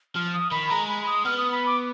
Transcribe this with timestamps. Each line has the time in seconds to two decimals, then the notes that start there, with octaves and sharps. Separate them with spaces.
0.15 F3 F6
0.33 D#6
0.51 D#3 B5
0.70 G#3 A#5
0.89 B5
1.06 D#6
1.25 B3 F6
1.38 D#6
1.52 B5
1.66 D6